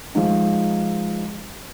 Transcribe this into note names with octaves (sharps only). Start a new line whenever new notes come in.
F3 G#3 D#4